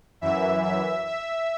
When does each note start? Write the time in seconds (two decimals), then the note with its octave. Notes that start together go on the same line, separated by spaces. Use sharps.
0.21 F#2 E3 E5
0.63 E5
1.06 E5